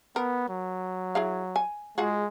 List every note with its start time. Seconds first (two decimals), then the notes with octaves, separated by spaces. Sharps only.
0.16 B3 A#4
0.49 F#3
1.15 E4 G#4 F5
1.56 G#5
1.98 G#3 F4 F#4 G#4